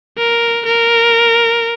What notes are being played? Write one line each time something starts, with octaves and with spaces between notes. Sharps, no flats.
A#4
A#4